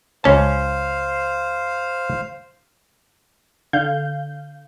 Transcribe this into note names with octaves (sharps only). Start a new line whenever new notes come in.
C#2 C#4 C5 F5 A5
D3 F5 G6